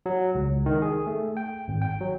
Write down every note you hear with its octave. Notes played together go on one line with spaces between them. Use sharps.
F#3
C#2
D#3
G#4
A3
G5
G#1
G5
F#3